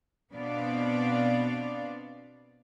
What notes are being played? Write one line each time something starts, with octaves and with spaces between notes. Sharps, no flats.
B2 B3 C4 D4 D5 F5